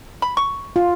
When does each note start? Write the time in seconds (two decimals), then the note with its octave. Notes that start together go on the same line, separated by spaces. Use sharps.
0.22 B5
0.37 C#6
0.76 F4